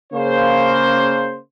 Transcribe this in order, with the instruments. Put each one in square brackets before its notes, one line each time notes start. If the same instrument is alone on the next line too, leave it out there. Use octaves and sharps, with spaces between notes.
[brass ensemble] C#3 A#3 C5